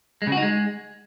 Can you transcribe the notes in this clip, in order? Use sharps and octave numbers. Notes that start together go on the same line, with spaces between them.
G#3
C#3
F#4
D#4
G#3